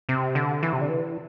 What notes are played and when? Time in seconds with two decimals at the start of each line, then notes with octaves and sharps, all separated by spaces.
0.09 C3
0.35 D3
0.63 E3
0.73 C3
0.81 D3
0.89 E3